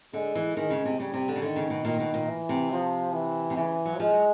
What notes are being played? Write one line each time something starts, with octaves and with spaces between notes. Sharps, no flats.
D3 G#3
E3
D#3 G#3
C#3
C3
C#3 G3
C3
D3
C#3
D3 D#3
C#3
B2
A#2 D#3
B2
A#2
E3
C3
F3
E3
C3
C#3 E3
F#3
F3 G#3
F#3